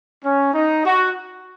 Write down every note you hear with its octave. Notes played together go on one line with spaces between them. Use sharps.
C#4
D#4
F#4